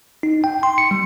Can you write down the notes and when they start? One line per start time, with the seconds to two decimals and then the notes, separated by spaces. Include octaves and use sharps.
0.23 D#4
0.44 G5
0.63 C6
0.78 C#7
0.91 G3